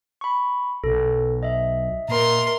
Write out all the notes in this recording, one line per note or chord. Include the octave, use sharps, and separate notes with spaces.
B5 C#6
B1 A4
D#5 E5
A#2 A#4 C6